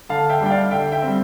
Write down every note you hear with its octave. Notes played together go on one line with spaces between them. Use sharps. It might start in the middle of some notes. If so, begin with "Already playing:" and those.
D3 F5 A5
E5 G5
G3 D4 G5
D5 F5
D3 E5 G5
E5 G5
C4
G3